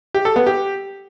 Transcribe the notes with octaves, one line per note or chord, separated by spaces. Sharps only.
G4
A4
B3
G4